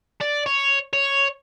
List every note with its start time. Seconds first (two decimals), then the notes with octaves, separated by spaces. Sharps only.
0.21 D5
0.46 C#5
0.93 C#5